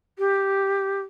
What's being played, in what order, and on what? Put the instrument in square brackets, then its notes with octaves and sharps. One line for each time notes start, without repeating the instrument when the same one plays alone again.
[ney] G4